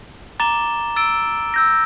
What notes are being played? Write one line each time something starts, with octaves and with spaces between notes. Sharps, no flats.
A#5 D6 A6 E7 G7
E6 A6 D7 G7
E6 G6 A#6